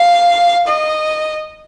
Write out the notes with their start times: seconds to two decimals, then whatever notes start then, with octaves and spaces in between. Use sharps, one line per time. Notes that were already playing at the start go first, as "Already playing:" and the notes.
Already playing: F5
0.67 D#5